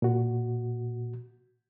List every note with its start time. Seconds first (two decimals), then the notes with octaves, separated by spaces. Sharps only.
0.02 A#2 F#4